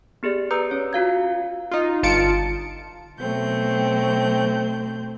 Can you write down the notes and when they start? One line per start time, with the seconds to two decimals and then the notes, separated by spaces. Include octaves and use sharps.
0.23 B3 G4 G#4 D5
0.51 B4 A#5 D#6 E6 G6 C#7
0.71 C#4 C#5
0.93 F4 F#4 F5 G#6
1.71 D#4 F4
2.03 G1 F4 A5 C#7 D7
3.19 B2 F#3 A3 C4 G6